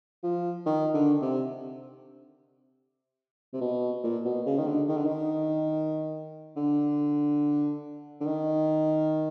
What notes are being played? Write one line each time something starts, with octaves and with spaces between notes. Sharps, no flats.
F3
D#3
D3
C3
C3
B2
A#2
B2
C#3
D#3
D3
D#3
D3
D#3
D3
D3
D#3